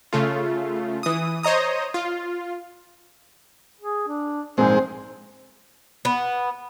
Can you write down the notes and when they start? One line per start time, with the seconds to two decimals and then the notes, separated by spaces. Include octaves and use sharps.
0.13 C#3 A3 F4
1.03 E3 D#6
1.43 C5 C#5 D#5 A#5 D#6
1.94 F4
3.81 G#4
4.08 D4
4.58 A#1 G#2 G#3 C4 C5
6.05 B3